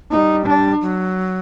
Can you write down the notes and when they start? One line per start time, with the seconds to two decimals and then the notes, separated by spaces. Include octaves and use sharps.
0.11 A#3 D#4
0.16 G3
0.46 D4
0.82 F#3